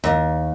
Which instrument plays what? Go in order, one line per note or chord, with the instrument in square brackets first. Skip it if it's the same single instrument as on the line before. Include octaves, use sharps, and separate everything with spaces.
[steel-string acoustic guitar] D#2